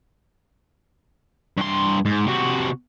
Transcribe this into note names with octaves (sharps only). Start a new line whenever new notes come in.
G2 C6
G#2
C3 F#4